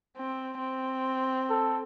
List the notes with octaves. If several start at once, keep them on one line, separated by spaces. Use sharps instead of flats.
C4
C4
A4